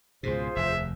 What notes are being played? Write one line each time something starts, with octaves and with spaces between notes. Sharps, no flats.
C#2 G#2 B2 F4 G#4 C5
F1 D#2 E5